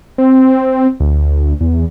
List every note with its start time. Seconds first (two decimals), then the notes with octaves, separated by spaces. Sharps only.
0.18 C4
1.00 D2
1.61 E2